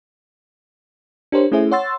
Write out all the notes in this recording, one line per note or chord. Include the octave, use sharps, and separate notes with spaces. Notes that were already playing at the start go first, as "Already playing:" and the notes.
D4 G4 A#4 C5 C#5
A3 C#4 E4 G#4 C5 E5
C#5 F#5 C6 E6 A6